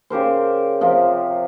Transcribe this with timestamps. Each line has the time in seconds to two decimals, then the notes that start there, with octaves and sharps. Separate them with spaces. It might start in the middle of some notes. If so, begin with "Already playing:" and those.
0.10 C#3 G4 A#4 C5
0.81 C3 F3 F4